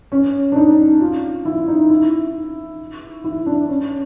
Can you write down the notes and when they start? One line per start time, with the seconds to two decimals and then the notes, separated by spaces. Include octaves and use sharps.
0.12 C#4
0.52 D4
0.56 D#4
1.01 F4
1.45 E4
1.68 D#4
1.90 E4
3.24 E4
3.46 D4
3.69 C#4